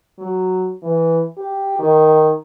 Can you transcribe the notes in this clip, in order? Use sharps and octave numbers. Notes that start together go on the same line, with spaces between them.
F#3
E3
G4
D#3